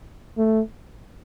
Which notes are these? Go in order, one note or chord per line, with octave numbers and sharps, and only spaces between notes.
A3